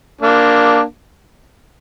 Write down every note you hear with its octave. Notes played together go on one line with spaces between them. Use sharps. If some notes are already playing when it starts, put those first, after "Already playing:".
A#3 D4